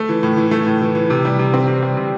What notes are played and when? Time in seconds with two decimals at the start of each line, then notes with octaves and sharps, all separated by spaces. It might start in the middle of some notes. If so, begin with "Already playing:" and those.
Already playing: A3
0.09 E3
0.23 A2
0.37 E3
0.51 A3
0.67 A2
0.82 E3
0.95 E3
1.10 C3
1.25 G3
1.39 C3
1.54 C4
1.68 C3
1.83 G3
1.97 C3